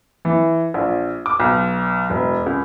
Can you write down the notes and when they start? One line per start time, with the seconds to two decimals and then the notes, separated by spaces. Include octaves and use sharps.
0.25 E3
0.74 A#1
1.26 D6
1.40 B1
2.10 E1
2.46 C#2